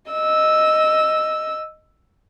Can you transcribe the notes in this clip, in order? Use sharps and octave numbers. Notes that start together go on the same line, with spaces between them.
D#5 E6